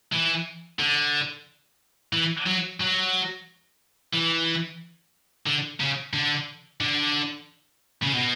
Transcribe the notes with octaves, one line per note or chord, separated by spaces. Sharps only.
E3
D3
E3
F#3
F#3
E3
D3
C#3
D3
D3
C#3
B2